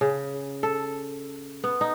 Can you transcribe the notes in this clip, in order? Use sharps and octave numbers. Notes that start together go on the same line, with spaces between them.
C#3
A4
B3
D#4